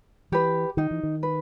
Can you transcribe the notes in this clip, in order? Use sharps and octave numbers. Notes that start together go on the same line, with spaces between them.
E3 G4 B4
D#3 D#4
E3
D#3
B4